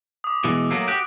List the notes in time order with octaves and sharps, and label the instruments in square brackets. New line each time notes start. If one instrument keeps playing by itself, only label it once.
[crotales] D6 D#6
[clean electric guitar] B2 E3 G#3
F#3 A3 A#3
F#4 G4